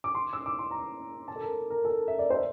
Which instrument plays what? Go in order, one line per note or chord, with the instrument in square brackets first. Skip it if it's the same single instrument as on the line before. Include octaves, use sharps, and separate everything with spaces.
[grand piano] D6
C6
E6
D6
C6
A#5
A5
A4
A#4
A#4
A4
E5
D5
C5